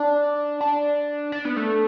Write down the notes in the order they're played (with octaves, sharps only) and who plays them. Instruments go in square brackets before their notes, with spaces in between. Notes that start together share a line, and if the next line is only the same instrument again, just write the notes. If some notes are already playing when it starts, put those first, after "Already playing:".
Already playing: [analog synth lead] D4
D4
D4
B3
A3